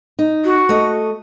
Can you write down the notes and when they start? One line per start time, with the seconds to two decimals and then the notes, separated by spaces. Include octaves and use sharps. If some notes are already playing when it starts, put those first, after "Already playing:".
0.19 D#4
0.45 F#4
0.69 A3 D#5